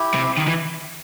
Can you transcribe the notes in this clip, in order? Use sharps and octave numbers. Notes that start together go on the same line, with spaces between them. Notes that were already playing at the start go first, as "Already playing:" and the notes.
Already playing: E4 G4
C3
D#3
E3